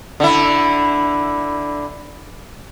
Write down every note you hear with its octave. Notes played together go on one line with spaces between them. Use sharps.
D3 E4